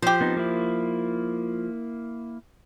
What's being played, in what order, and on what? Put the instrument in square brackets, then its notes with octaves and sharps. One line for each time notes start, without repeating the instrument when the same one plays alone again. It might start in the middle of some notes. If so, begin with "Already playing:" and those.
[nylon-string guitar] F3 [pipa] G4 C5
[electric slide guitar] B3 C4 D#4
A#3 E4